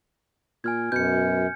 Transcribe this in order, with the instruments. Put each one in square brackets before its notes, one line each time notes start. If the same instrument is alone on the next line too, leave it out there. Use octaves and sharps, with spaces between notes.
[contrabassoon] A#2 [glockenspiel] G#5 F6 G#6
[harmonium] F#2 [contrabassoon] B2 [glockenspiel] G6 C#7